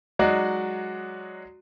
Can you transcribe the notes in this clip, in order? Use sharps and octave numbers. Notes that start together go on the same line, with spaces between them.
F#3 G#3 D#4 F#4 D5